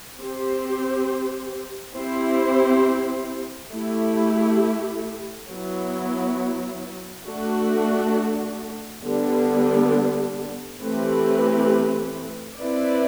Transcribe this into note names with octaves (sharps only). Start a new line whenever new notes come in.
C4 G4 C5
C4 E4 G4 C5
A3 E4 G4
F#3 B3 E4
A3 D4 F#4
D3 G3 B3 D4
E3 A3 C4 G4 B4
C4 E4 B4 D5